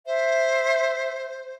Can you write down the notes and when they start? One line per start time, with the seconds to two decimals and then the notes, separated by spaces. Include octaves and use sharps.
0.06 C5 E5